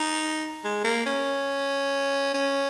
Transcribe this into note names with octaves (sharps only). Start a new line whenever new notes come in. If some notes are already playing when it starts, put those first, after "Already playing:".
Already playing: D#4
G#3
A#3
C#4
C#4